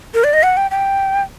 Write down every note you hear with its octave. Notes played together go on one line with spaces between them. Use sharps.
A#4
D5
D#5
F#5
G5
G5